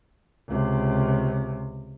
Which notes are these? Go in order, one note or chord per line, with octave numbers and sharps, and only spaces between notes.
C#2 C3